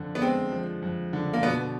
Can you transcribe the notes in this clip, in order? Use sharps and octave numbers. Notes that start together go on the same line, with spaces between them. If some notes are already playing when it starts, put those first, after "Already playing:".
Already playing: F2 D3
B3
G#3 C4
F3
F2
D3
A#3
B2 B3